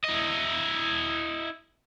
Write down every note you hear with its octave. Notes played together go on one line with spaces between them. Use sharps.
E4 D#5